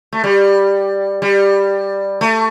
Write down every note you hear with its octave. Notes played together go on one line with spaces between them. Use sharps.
A3
G3
G3
A3